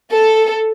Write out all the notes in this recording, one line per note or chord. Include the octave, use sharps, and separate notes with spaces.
A4